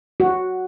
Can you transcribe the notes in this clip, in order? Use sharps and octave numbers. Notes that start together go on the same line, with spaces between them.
F#4